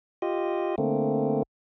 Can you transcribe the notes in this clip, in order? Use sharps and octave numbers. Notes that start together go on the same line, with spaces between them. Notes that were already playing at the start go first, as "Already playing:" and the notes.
F4 G4 D#5
D3 A3 A#3 C4